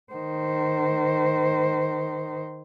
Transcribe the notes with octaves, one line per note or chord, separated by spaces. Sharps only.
D#3 C5